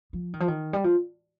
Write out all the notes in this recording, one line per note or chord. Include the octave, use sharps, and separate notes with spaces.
F3
D#3
F3
D#3
G3
F3